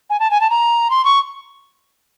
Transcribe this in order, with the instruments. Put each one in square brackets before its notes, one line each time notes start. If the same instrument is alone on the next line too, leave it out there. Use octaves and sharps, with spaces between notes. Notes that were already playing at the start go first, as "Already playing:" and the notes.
[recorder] G#5
A5
G#5
A5
A#5
C6
C#6